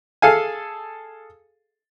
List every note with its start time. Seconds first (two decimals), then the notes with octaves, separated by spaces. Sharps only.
0.22 G#4 A4 F5 G#5